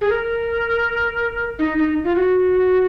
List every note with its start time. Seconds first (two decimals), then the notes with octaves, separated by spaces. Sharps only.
0.01 G#4
0.10 A#4
1.59 D#4
1.78 D#4
2.04 F4
2.16 F#4